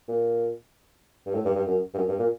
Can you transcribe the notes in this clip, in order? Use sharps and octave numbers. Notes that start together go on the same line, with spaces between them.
A#2
G2
A2
G2
G2
F#2
G2
F#2
G2
A#2